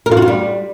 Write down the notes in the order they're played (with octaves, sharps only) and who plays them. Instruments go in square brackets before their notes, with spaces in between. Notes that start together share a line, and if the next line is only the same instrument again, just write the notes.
[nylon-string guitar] A#4
F4
F#4
F4
G3